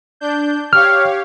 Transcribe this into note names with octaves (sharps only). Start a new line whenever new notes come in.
D4 G6
G4 C#5 F5 F6